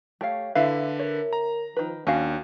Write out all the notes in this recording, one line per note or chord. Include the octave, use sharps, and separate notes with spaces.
A3 G4 C#5 F5
D3 E4 B4 E5 F5
A#4 C#5
A#5
D#3 F3 B4
D#2 C#4 D4 F#4 F5 G#5